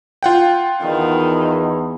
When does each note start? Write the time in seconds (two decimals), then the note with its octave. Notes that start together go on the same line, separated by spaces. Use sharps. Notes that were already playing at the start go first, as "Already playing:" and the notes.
0.23 F4 F#5 G5
0.83 E2 D#3